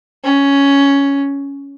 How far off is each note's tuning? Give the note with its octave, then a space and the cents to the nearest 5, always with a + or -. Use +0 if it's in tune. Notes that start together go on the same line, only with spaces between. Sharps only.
C#4 +10